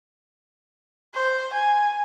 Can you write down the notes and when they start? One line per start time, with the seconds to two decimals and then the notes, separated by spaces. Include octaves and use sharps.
1.14 C5
1.53 G#5